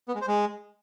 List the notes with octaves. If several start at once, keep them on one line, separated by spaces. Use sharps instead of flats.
B3
G#3
C5
G#3